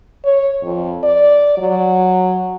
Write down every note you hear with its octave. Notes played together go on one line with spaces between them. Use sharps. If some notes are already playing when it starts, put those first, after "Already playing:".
C#5
F2
D5
F#3